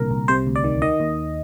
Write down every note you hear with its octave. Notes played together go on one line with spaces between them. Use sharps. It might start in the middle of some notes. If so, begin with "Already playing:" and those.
Already playing: C2 A#2 D3 A#4
C2
C3 C5
D2
D5
D#3
D#3 D#5
D#2